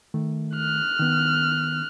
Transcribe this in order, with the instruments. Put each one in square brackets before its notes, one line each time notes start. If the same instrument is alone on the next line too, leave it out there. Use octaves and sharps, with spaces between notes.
[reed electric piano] D#3 A3
[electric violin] F6 F#6
[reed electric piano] D#3 B3